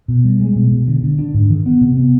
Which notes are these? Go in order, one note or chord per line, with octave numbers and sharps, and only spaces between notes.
B2
G3
G#3
B2
B2
D3
D3
D4
G#2
D#3
B3
C3
B3